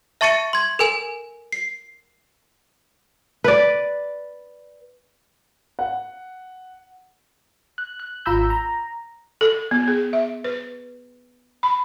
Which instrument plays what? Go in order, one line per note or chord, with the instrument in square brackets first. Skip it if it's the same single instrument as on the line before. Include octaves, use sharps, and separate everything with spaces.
[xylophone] E5 A5 C#6 A6 C#7 D#7
C6 G#6
A4 A#4 G#5 E7
C7
[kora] B4 D5
[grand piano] F#5
[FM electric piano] F#6
F#6
G#1 F4 A#5 B5 E6 G6
A#5
[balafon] A4
B3
G#4
E5
B4
B5